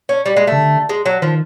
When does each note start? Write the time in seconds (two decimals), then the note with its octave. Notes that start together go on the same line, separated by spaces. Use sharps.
0.09 C#4
0.26 G3
0.37 G#3
0.47 C#3 A3
0.57 D3
0.89 G#3
1.06 F#3
1.22 D#3 F3